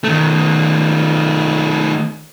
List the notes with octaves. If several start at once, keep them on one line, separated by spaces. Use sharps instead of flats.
D#3 A3